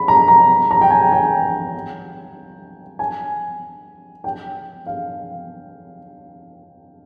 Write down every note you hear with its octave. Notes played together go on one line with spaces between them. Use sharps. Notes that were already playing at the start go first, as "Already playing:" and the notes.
Already playing: B5
A#5
A#5
A#5
G5
G#5
G5
G#5
G5
F5